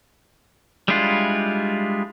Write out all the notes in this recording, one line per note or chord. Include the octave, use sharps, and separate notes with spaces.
G3 G#3 D4 E4 F4